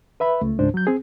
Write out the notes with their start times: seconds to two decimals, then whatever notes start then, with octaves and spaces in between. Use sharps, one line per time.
0.20 B4 E5 B5
0.41 C#2 A3
0.59 C#2 G#2 D4 C5
0.74 F#3 G6
0.87 C4 G#4